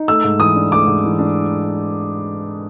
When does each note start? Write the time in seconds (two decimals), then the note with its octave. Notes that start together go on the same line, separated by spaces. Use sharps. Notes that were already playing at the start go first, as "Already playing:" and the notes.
Already playing: D#4
0.08 A3 E6
0.24 G#2
0.39 E3 D#6
0.55 D4
0.72 A3 D6
0.87 G#2
1.03 E3
1.19 D4